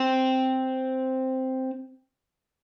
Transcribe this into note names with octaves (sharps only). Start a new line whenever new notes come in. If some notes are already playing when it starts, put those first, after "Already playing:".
Already playing: C4